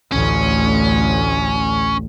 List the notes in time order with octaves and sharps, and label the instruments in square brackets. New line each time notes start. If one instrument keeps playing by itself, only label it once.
[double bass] A1 D2 [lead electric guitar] C#4